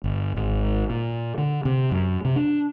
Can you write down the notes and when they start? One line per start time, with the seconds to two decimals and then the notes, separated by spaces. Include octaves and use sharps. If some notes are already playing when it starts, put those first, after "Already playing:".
0.04 G1
0.36 G#1
0.90 A#2
1.38 D3
1.65 C3
1.91 F#2
2.25 C3
2.36 D4